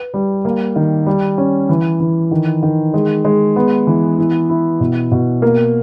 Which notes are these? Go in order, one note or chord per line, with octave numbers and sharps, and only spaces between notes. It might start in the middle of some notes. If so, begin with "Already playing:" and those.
Already playing: B4
G3
A#3
D#3
G3
C#4
E3
E3
D#3
D#3
G#3
G#3
B3
E3
E4
E4
B2
B2
A#3